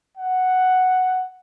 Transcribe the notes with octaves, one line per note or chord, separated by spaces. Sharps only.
F#5